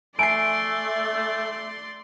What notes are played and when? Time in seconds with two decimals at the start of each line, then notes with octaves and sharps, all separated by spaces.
0.19 A3 D5 E5 G#5 C6 C7 D7